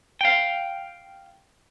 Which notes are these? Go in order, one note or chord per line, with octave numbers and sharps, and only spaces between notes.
F5 G5